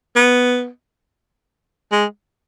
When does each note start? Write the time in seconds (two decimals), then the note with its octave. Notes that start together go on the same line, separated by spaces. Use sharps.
0.16 B3
1.92 G#3